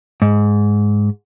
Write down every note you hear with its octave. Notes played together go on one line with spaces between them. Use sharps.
G#2